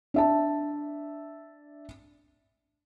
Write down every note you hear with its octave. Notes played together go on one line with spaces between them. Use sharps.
D4 E5 A5